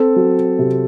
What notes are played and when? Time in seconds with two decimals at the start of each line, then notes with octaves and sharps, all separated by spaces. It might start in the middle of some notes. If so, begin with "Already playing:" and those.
Already playing: C4 A4
0.16 F#3
0.59 C3